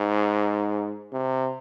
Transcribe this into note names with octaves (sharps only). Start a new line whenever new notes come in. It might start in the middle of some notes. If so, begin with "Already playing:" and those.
Already playing: G#2
C3